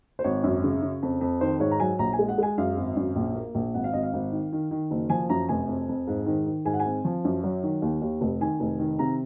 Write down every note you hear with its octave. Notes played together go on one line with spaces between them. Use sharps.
C5
G#1 C#5
F#2
C#3
C#3
F2
F2
D#3 C5
G#2 C#5
A#5
F#3 G#5
A#1 A#5
G#5
G#3
F#5
G#3 G#5
F#2 F5
G#1
F#2
A#1
A#3
A#1
G#1 F#5
F5
G#1 D#5
F5
G#1
D#3
D#3
D#3
F#1
F3 G#5
F#2 A#5
F1 G#5
F2
F2
G#2
D#3
D#3
G#2 G#5
F#5
G#5
C4
F3
F#2
F#3
D#3
D#2
D#2
F1
D#3 G#5
F1
D#3
C3 A#5